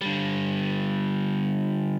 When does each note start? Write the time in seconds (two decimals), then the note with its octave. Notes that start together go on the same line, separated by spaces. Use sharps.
0.01 D3 G3